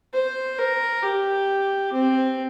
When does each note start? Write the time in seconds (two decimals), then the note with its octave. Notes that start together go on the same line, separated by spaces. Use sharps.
0.14 C5
0.58 A#4
1.03 G4
1.93 C4